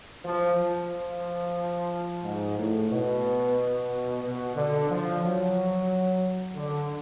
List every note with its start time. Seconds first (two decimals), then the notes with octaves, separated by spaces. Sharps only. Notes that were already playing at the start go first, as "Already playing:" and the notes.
0.25 F3
0.58 F3
2.23 G#2
2.57 A2
2.90 B2
4.23 B2
4.56 D3
4.90 F3
5.23 F#3
6.56 D3